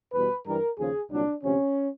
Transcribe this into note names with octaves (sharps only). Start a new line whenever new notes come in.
E2 B2 G3 B4
G2 E3 G3 A#4
D#2 C#3 F3 G#4
C2 A#2 F#3 D4
D2 C3 F3 C#4